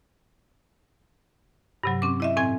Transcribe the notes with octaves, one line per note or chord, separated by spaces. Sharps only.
G2 C3 F#3
C4 C#4 D6
E4 D#5 E5
A2 C4 G#5 G#6